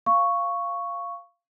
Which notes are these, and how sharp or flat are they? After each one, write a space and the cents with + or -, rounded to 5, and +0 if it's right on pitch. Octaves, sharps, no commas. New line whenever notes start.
F5 -10 C#6 +0